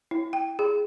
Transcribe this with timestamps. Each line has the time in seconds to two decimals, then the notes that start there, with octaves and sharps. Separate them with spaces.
0.11 E4
0.33 G5
0.59 G#4